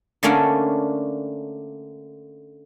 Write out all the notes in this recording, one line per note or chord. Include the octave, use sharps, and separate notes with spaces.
D3 A3 A#3 C#4 D4